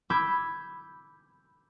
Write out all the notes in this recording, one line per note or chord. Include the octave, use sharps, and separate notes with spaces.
B5 D6 E6 G6 G#6